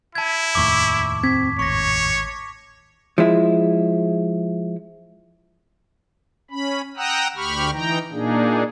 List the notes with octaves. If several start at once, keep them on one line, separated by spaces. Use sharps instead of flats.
E4 A5 G#6
F1 D#2 A2 C#6 D6
C4 G#6 B6
G#1 C#5 C#6 A#6
F3 G#3 E4
C#4 B5
F#5 G5 A#5 D#6 E6 F#6
D2 G4 B5 C#6 F6
E3 D#4 G5 A#5
A#2 A#3 D4 D#4 G#4